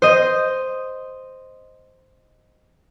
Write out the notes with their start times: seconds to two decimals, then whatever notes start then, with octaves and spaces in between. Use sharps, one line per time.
0.02 C5 D#5